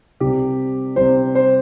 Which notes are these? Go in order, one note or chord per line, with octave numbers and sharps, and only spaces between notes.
C2 C3 G3 C4 G4
C2 C3 G3 C4 C5
C5